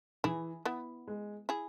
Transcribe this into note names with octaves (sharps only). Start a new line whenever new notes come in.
E3 E4 G#4
B3 E4
G#3
E4 G#4